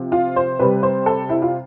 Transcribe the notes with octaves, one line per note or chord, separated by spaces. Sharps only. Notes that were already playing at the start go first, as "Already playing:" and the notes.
Already playing: C3 F3
F4
C5
C3 G3 B4
C5
A4
E4
F4